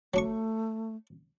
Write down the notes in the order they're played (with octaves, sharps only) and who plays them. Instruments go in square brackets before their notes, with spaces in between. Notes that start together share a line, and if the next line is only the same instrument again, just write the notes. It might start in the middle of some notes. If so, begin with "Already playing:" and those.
[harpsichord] F#3 D4 C#6 [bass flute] A3